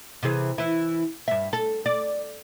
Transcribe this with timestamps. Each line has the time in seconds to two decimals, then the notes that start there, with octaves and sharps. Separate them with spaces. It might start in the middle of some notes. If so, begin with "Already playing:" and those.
0.23 C3 E3 G#4
0.58 E3 E4
1.28 G2 E5
1.53 A4
1.86 D5